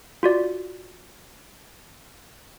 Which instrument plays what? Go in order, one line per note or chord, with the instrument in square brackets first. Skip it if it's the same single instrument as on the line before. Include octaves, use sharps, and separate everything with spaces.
[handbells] F4 F#4 D5